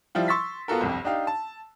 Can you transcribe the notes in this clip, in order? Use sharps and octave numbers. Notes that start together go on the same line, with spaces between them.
F3 G3 E4 F4
C6 C#6 E6 A6 B6
B3 F4 F#4 A4 A#4
G1 C2 F2
D4 D#4 G4 F5
A5